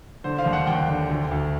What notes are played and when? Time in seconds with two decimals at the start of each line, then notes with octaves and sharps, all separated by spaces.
0.24 D3 C5
0.39 F5
0.46 D#2
0.53 F#5
0.67 D#2 G5
0.88 D3
1.09 D2
1.31 D2